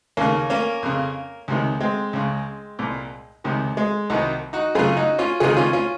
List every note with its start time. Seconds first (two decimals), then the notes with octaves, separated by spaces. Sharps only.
0.17 D#2 C#3 A#3 C#4
0.50 A#3 C#4
0.83 F2 C#3
1.48 C#2 C3 D#3
1.80 G#3 C4
2.13 C#2 C#3
2.79 C2 A#2
3.44 C#2 C3 D#3
3.77 G#3
4.10 C2 C3 D#3 D#4 F#4
4.53 D#4 F#4
4.75 F#2 C#3 F4 G#4
4.97 D#4 F#4
5.19 C#4 F4
5.40 C#2 C3 D#3 F4 G#4
5.57 C#4 F4
5.73 C#4 F4